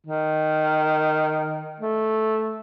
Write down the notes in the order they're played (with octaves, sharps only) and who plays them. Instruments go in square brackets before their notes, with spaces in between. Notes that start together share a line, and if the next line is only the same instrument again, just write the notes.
[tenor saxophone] D#3
A3